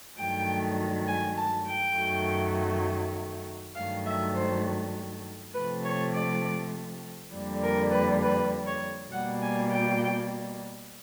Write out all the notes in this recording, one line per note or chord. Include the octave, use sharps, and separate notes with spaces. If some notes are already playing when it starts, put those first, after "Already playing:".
G2 D#3 F#3 A3 G5
G#5
A5
G5
F#2 D#3 F#3 A3
G2 D#3 F#3 A3 F5
E5
C5
C3 F3 A3 B4
C#5
D5
F2 D3 G3 A#3
A#4
B4
B4
C#5
B2 G3 A#3 F#5
G#5
G5